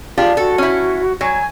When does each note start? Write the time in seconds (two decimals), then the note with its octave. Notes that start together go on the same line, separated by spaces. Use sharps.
0.18 D4 F4 G4 G#4
0.37 F#4 A4
0.58 C#4 E4
1.21 F#3 G#5